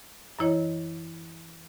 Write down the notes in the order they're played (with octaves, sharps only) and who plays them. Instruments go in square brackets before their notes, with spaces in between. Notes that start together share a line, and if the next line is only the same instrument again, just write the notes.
[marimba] F#2 E3 E4 C#5 D#5